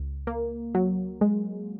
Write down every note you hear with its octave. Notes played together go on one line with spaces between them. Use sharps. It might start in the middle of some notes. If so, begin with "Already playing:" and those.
Already playing: C#2
A#3
F#3
G#3